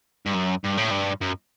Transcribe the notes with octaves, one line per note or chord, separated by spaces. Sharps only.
G2
F#2
G2
A2
G2
F#2